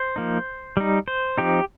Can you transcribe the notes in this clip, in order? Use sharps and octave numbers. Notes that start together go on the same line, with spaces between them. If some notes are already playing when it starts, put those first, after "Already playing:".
Already playing: C5
F3 A#3 D#4
G3 D#4
C5
F3 C4 D#4 G4